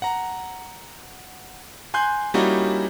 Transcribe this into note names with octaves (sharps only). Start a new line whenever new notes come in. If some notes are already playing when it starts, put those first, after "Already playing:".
F#5 A#5
G#5 C6 F#6 G6
G3 A#3 C#4 D#4 E4 F#4